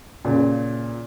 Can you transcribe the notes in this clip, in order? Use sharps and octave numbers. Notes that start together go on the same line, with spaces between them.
A#2 C#3